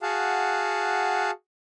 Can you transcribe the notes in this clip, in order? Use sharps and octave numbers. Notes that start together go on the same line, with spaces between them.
F#4 G#4 F5 F#5 A5